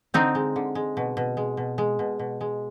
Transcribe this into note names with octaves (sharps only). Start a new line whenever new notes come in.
D3 C4 D#4
G#3
D3
G#3
B2
B2
G#3
B2
G#3
B2
B2
G#3